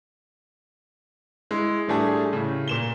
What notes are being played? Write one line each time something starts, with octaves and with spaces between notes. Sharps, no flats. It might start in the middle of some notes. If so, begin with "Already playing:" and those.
G#3 E4
A2 E3 G3 A3 D4 G#4
A2 C#3
A#2 E7 G7